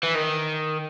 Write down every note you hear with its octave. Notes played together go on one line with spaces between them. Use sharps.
E3
D#3